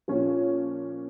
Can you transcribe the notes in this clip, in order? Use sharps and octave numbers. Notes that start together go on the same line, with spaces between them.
A#2 F3 C#4